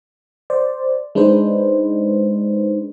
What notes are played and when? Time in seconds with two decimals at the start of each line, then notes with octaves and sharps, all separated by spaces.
0.50 C5 D5
1.15 G#3 D4 D#4 B4 C5